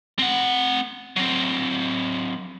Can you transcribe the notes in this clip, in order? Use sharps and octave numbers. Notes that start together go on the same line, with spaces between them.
C4 F#5
F#3 C4